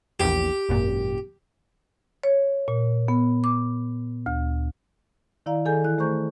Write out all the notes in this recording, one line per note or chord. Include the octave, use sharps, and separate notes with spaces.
A#1 E2 G4
G#1 F#2 A#2
C#5
A#2
B3
D6
D2
D#3 E4 D5 F5 A#5
D#3 G#4 A4 G#5 G6
E3 E4 F#6
A3 G#4 C5 A#5 C#6 G6